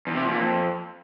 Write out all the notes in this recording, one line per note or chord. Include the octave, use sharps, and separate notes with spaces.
E2
C3
E2
A#2
F2